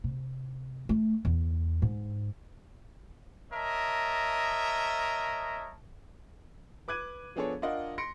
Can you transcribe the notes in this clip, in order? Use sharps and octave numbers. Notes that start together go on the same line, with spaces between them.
C3
A3
E2
G#2
A#4 C#5 D#5 E5 A5
B4 D6 F#6 G#6 D#7
F3 B3 D4 G#4 A4 C#5
D4 F4 A#4 D#5 F#5
C6 A#6 C#7 D7